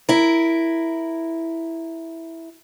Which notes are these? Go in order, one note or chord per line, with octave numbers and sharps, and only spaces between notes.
E4 A#4